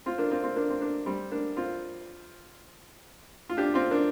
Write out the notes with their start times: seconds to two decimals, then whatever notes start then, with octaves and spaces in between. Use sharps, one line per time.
0.06 C4 F4
0.18 A#3 D4
0.31 C4 F4
0.43 C4 F4
0.56 A#3 D4
0.70 C4
0.81 A#3 D4
1.06 G3 C4
1.31 A#3 D4
1.57 C4 F4
3.50 F4
3.57 D4 G4
3.74 C4 F4
3.91 A#3 D4